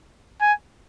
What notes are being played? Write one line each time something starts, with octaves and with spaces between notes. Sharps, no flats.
G#5